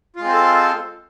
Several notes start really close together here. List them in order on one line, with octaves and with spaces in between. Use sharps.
F4 G#3 C4 C5 A4